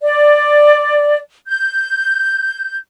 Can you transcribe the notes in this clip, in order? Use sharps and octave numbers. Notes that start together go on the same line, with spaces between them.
D5
G6